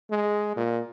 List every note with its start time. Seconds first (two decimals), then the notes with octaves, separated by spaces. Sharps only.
0.11 G#3
0.56 A#2